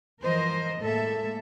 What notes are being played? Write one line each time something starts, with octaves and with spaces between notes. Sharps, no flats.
E3 F3 A#4 C5 D#5
A2 G#3 A#3 A4 E5